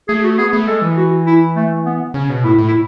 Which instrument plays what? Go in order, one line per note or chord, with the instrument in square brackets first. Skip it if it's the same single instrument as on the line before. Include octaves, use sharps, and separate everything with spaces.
[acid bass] A3 [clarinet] G#4
[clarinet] F#4
[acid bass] B3 [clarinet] G#4
[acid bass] A3
[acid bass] G#3 [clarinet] A4
[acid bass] E3
[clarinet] F#4
E4
A3
B3
[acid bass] C#3 [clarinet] C#4
[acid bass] B2
[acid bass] A2 [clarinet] E4
[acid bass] A2
[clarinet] E4